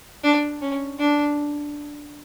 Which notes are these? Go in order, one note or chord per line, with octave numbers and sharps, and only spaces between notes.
D4
C#4
D4